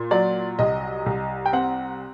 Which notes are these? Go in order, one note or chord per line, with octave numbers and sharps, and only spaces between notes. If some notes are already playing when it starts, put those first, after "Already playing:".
Already playing: A#2
F#3 D5
C2 D#5
C2
G5
C4 F#5